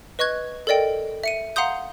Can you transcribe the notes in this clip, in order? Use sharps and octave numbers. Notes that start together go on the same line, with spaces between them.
B4 D#5 C#6 F#6 G#6
A4 A#4 D5 D#5 G5
E5 C#7 D#7
F5 F#5 A#5 C6 D#6 G6